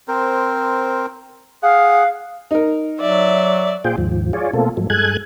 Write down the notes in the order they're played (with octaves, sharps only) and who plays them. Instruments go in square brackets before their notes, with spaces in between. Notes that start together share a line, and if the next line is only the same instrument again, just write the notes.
[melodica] C4 A#4 C5
[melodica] G#4 F#5 [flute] F5
[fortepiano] D#4 A#4
[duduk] F#3 [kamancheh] D5 E5
[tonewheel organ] A#2 F4 G#4 C5 G5
D#2 G#2 F3
F4 G#4 C#5 D5
B2 A3 A#3 C4 F4 A4
G#2 F3 F#3 A3
G2 G#3 A4 G#5 F#6 G#6